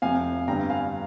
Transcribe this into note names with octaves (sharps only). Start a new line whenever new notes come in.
F1 F2 C3 F5 G#5
G1 G2 G3 G5 A#5
F5 G#5